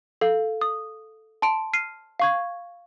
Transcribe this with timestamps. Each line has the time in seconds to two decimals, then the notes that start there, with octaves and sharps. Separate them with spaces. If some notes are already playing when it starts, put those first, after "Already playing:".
0.21 A4 F5
0.61 D#6
1.42 A5 C6 D7
1.73 F6 C7 D#7
2.20 F5 C#6 G#6